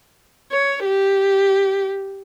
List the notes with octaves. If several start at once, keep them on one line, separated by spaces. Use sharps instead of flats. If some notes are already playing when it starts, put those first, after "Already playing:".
C#5
G4